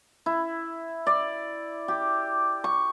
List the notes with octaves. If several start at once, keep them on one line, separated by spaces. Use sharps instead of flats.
E4
D5
G4
C#6